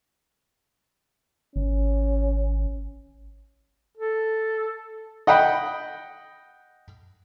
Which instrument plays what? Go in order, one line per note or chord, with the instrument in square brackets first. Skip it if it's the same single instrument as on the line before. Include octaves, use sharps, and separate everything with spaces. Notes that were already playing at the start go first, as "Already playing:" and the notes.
[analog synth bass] G#1 [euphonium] C#4
[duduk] A4
[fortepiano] D#5 F#5 G5 B5